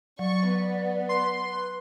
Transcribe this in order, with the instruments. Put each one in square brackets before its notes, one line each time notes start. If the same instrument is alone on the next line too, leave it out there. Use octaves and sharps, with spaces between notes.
[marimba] F#3 [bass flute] D5 [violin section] C#6
[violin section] B3
[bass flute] B4 [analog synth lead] C6